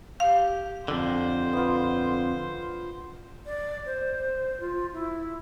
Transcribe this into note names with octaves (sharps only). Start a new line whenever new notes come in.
G4 F5
F2 D3 C5
B3 F4
D5
C5
F4
E4